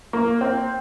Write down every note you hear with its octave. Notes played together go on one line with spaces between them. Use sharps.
A#3
C4